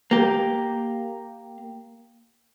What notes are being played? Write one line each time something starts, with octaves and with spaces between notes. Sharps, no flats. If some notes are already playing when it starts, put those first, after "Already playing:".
A#3 G4